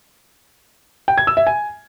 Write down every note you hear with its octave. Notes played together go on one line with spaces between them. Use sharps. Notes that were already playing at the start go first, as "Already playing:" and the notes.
G5
G#6
E6
E5
G#5